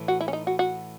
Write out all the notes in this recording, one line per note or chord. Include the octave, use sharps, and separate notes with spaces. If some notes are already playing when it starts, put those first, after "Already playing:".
Already playing: A2 E3
F#4
E4
C#4
D#4
F#4
F#4